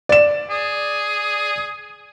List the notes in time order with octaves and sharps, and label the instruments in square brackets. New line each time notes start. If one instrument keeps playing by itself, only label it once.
[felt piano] D5 E7
[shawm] G#4